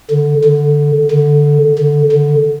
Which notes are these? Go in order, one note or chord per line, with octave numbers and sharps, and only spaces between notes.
D3
D3
D3
D3
D3